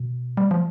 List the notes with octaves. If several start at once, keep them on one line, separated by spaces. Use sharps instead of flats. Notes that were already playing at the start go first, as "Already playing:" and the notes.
Already playing: B2
G3
F3